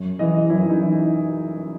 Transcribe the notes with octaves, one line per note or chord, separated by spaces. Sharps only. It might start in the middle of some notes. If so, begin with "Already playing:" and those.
Already playing: F#2
E3 D#5
F#2 E4
D#4
E3